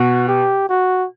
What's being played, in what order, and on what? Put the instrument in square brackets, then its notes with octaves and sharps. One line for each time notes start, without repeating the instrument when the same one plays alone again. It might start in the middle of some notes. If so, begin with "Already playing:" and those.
Already playing: [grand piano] B2 [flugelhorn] F#4
[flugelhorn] G4
F#4